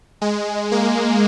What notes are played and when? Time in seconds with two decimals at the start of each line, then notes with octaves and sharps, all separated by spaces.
0.21 G#3
0.72 A#3